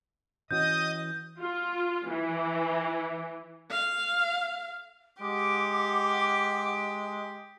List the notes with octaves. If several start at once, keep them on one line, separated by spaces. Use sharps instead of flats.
E3 C#4 F#4 D#5 D#6 G6
F4
E3
F5
G#3 G4 F#5 D6